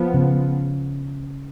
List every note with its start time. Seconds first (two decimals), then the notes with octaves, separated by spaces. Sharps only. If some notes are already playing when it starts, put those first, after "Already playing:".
Already playing: F3 B3
0.14 C#3